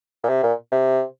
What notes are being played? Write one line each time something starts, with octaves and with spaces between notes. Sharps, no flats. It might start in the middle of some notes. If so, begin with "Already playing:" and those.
A#2
C3
A#2
C3